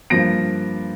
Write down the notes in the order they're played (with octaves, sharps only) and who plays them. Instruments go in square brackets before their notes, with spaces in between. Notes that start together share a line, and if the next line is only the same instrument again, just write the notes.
[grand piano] G2 F3 A#3 A#6 D7